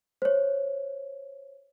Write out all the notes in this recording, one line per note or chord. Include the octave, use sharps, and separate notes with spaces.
C5 C#5